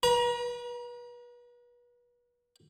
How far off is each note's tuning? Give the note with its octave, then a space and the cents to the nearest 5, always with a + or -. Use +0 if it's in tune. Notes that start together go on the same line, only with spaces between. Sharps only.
B4 -30 A#5 +35